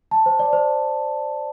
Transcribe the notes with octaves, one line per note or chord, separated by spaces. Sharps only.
A5
C5
D5
C5